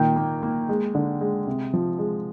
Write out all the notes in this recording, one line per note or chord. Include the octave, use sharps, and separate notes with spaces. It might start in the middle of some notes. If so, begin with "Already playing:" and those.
Already playing: A#2 D#3 G5
A#3
A#3
G#3
D3
G#3
C3
F3
G#3